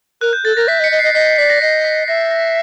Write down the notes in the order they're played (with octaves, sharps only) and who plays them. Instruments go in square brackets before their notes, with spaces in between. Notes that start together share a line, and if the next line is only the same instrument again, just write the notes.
[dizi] A#4 [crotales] F#6
[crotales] G6
[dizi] A4 [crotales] A6
[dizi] A#4 [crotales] A#6
[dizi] E5 [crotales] B6
[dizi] D#5
[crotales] B6 C#7
[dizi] D#5
[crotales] C7
[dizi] D#5
[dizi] D#5 [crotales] B6
[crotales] B6
[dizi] D5 [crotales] B6
[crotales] A#6
[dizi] D#5 [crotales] C7
[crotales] B6
[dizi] E5 [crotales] A#6
[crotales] A#6